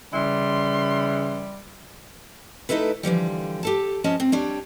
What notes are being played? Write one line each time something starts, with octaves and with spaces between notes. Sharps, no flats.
C#3 E3 G3 C6
A3 D#4 E4 A4 B4
D3 E3 F3 G3
G4 A4 A5
F3 C#4 D#5 A5
C4
G3 D4 C#5